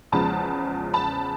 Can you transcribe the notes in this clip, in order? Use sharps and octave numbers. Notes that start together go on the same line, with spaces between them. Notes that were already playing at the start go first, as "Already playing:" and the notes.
E2 C#3 F3 G#3 B3 A5 B5
A5 B5